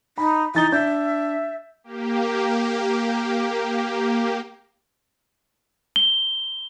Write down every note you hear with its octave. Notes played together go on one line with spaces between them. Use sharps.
D#4 B5
E3 D#4 A6 G7
D4 E5 G6
A#3 G4
G7